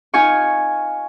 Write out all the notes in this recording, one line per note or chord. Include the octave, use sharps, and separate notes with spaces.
D#4 F4 G#5 C#6